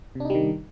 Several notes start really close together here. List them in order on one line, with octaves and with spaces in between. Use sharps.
C3 D4 D#4 G3 D#3